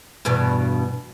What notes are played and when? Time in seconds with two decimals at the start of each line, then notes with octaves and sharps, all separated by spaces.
0.25 E2 G2 B2